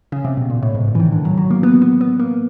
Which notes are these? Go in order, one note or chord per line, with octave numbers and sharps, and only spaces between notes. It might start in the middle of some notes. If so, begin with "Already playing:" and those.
C#3
C3
B2
A#2
A2
G#2
A#2
E3
D#3
D3
F#3
F#3
A#3
B3
B3
B3
A#3